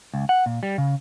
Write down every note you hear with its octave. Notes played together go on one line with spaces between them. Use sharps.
C#2
F#5
A#2
G3
C#3